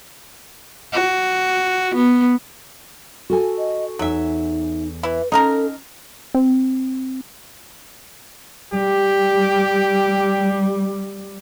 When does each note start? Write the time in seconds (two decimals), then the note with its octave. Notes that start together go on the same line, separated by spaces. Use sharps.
0.92 F#4
1.95 B3
3.30 F#4 A4 G#5
3.58 D#5
3.99 E2 F#3 D#4 E5 G#5
5.03 E3 E4 B4
5.32 C#4 D#4 A4 A#4 F5 A5 A#5
6.34 C4
8.74 G3 G4